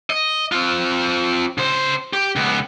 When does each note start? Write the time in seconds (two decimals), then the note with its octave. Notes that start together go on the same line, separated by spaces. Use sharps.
0.10 D#5
0.52 C4 F4
1.58 C#3 C5
2.13 G4
2.36 C#2 B3